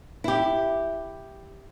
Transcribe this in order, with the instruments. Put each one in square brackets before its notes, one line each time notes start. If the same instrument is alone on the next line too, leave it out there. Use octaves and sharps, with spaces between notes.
[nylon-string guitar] E4 G4